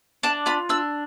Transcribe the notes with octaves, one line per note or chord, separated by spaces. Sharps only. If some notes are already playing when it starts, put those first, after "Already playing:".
D4 A5
F4 B5
D4 E6